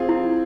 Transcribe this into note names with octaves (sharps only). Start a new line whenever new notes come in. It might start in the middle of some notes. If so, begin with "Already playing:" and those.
Already playing: C4 F4 G#4
E4